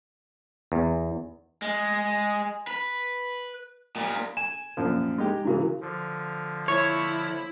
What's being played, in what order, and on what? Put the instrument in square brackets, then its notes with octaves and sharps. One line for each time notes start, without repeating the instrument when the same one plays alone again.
[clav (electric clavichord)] E2
[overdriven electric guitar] G#3
B4
A#2 G3
[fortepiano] G#5 [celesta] E7
[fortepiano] F#2 A#2 F3
G#3 D#4 G4
[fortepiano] G#2 C#3 E3 [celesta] E4 F#4 A#4
[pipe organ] D3 F3
[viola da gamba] E4 [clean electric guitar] C#5